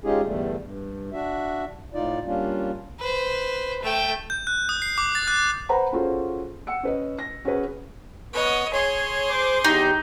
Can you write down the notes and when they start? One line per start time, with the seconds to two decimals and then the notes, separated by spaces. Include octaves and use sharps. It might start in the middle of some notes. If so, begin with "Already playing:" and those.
0.04 G#3 C#4 D#4 F4 G4 G#4
0.24 E2 G2 D3 G3 A3
0.62 G2
1.13 D4 F#4 E5
1.94 A2 D#4 F4 D5
2.26 G3 A#3 C#4 D4 F4
3.00 B4 C5
3.82 A3 G5
4.30 G6
4.47 F#6
4.69 D#6
4.82 C7
4.98 D6
5.15 A6
5.28 F#6
5.69 B4 C5 F#5 A#5 B5
5.92 C#4 F4 F#4 G#4 A4 C5
6.67 F#5 E6 C#7
6.83 C#4 B4 D#5
7.19 A#6
7.45 C#4 F#4 G#4 B4
8.33 B3 C#5 D#5
8.73 G#4 C#5 C6
9.30 C5 D6
9.64 E2 D#4 G4 G6